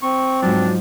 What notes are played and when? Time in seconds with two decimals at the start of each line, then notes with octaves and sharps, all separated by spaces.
0.03 C4 C#6
0.42 G#2 F3 F#3 D4